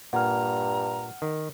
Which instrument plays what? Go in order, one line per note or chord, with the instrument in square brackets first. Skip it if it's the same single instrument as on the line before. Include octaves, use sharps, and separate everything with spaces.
[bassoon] G2 [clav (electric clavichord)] A#2 [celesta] F#5 F6 [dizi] A#5
[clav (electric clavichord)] D#3